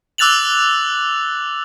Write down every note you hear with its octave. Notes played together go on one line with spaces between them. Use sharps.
D6 E6 F#6 A6 F7 F#7